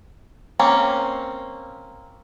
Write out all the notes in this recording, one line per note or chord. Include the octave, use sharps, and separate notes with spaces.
A#3 C4 C#4